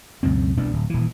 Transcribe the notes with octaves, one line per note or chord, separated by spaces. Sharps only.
C#2 F#2 B2 C4
E1 C2 B3 D4
D1
D#1 E3